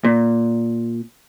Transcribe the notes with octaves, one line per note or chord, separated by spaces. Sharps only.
A#2